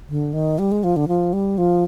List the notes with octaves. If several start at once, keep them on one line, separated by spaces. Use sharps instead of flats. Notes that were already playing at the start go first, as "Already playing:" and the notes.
D3
D#3
G3
G#3
F3
D3
F3
G3
F3